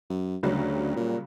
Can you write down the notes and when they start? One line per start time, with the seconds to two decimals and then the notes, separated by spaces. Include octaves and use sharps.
0.10 F#2
0.43 D2 C#3 F#3 G3
0.96 A#2